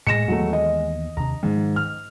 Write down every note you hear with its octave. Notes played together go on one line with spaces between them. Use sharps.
A2 G#3 A#6 C#7 E7
D#2 E3 F#3 A3 B3
D#5
D#2 C3 D4 A#5
G#2 D#3 F3
F6